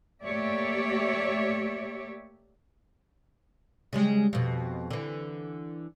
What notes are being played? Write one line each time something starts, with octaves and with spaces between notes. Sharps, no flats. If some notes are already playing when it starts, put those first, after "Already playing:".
A3 A#3 G4 C#5 D5 E5
C#3 G3 G#3
F2 B2
D3 E3